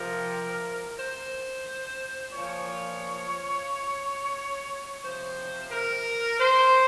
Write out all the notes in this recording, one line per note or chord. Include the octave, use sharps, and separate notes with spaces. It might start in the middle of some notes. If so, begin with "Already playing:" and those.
Already playing: C3 F3 A#4
C5
A#2 F3 C#5
C3 F3 C5
A#4
C5